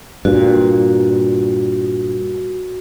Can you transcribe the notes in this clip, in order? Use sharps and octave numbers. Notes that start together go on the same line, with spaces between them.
G2 A#2 F#4